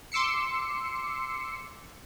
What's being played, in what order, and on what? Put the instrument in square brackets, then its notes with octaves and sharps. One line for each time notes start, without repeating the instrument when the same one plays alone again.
[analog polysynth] C6 D6 E6 C7 C#7